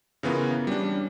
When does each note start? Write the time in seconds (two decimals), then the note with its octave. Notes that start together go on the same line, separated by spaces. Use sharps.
0.23 C#3 E3 B3 F4 A#4
0.67 G3 C#4 D4